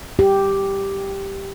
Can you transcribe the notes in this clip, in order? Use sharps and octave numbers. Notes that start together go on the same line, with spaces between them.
G4